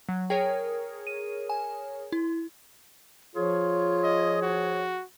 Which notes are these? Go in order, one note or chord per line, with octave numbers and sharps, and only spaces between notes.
F#3
G#4 A#4 C#5 G5
D#7
G#5
E4
F3 F4 G#4 C#5
D#5
F#4